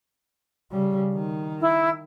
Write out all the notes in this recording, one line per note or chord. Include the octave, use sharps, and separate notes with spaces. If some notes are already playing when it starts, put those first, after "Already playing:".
C#3 G3
D#3
E4